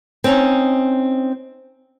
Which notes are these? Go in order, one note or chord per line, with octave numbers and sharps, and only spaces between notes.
C4 C#4 D#4